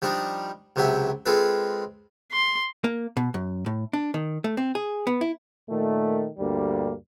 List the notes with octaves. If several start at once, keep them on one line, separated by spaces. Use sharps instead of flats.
F3 G3 D4 D#4
C#2 C3 F#3 G4 E5
G#3 C4 F4 A4 B4
C6
A#3
B2
F#2
A2
D4
D#3
A3
C4
G#4
B3
E4
A#2 D#3 A3
D2 G2 G3 A#3